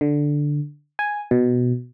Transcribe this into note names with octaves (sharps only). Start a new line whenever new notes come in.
D3
G#5
B2